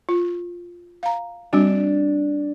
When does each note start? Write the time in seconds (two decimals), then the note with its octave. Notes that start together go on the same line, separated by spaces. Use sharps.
0.09 F4
1.03 F5 A#5
1.53 G3 C4 D4 F#4